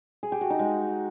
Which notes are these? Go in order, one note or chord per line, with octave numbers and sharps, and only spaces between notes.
G#4
G4
F#4
D#4
G#3